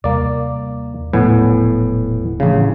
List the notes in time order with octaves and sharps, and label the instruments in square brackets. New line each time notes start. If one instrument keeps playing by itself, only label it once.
[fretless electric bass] D#2 C3 G3 [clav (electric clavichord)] A#3 D5
[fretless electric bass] D#1 F3 F#3 [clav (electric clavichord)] A2 B3 G#5
[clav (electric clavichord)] A1 C#3 [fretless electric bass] F3 A3 D4